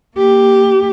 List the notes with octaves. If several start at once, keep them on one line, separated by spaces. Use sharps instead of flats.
A#3 G4